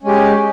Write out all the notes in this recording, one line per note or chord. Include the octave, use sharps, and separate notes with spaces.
G#3 C#4 G4